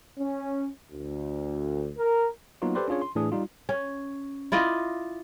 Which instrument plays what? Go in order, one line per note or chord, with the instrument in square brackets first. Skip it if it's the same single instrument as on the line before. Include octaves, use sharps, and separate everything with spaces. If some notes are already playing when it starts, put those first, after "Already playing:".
[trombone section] C#4
D2
A#4
[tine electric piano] F#3 A#3 B3 D#4 F4 F#4
G4 A4 B4 C5 D5 C6
C#4 D4 F4 G#4 C#5
C6
A2 E3 A3 D4 G#4 D#6
G3 D#4 F4
[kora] C#4
E4 F4 D5 D#5